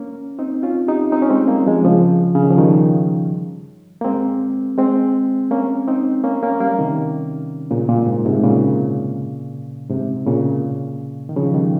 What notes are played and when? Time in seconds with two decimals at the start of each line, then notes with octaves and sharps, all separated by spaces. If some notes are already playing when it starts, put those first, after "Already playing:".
Already playing: A#3 C#4
0.39 C4 D#4
0.63 C#4 F4
0.88 D#4 G4
1.12 C4 D#4
1.22 C#4
1.30 G#3 C4
1.48 G3 A#3
1.66 F3 G#3
1.85 C#3 F3
2.35 C#3
2.43 D#3
2.50 F3
2.58 D#3 G3
4.01 A#3
4.04 G#3 C4
4.78 G#3 C4
5.51 A#3 C#4
5.88 C4 D#4
6.24 A#3 C#4
6.43 A#3 C#4
6.60 G3 A#3
6.79 C3 D#3
7.71 A#2 C#3
7.89 A#2
8.07 G#2
8.25 G#2 C3
8.43 A#2 C#3
9.90 G#2 C3
10.26 A#2 C#3
11.29 D#3
11.36 C#3 F3
11.54 D#3 G3